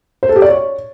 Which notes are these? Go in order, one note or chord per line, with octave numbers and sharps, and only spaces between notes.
C5
A4
G4
D5
C#5